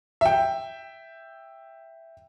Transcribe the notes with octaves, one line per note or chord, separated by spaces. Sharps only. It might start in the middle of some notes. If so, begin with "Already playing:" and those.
E5 G5